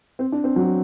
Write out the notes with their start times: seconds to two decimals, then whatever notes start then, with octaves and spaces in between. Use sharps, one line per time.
0.19 C4
0.32 D4
0.44 C4
0.56 F#3